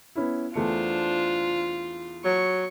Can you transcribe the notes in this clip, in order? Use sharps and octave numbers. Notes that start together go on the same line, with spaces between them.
B3 C#4 E4
E2 A3 D4 F4 C5 C#7
F#3 C#6